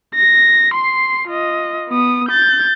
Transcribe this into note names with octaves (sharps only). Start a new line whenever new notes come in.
A#6
C6 C7
F4 D#5
B3 D#6
G6 A6